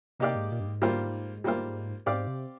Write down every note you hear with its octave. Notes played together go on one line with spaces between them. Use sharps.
C3 A#3 D#4 G4 D5 F5
G#2
A#2
G2
G#2
G3 A#3 F4 C5 F5
G3 A#3 F4 C5 F5
G#2 C4 G4 D5 F5
C3